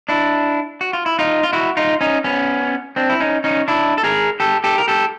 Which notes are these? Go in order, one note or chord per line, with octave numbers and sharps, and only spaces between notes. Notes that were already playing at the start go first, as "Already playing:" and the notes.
D4 E4
F#4
F4
E4
D#4 F4
F4
E4 F#4
D#4 F4
C#4 D#4
B3 C#4
C4 D4
E4
C#4 D#4
C#4 D#4
D4 E4
A4
G#4 A#4
G4 A4
G4 A4
A#4
G4 A4